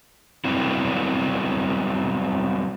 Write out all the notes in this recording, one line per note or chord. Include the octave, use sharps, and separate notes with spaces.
F#3 G3 B3 C4 E4